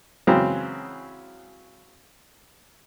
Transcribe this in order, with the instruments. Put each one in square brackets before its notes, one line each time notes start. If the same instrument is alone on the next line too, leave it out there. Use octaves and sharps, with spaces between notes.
[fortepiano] C#3 E3 F#3 G#3 B3 C4